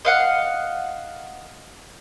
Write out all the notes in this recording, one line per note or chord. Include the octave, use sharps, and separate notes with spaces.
D#5 F5 F#5